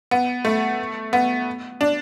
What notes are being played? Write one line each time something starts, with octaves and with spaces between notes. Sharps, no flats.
B3
A3
B3
D4